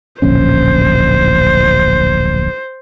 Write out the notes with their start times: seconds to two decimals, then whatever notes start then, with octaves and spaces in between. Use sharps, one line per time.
0.22 D1 A#1 C#4 C5